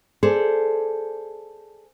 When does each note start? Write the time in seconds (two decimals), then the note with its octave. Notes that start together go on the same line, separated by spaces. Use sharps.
0.23 G#4 A4 C5 D5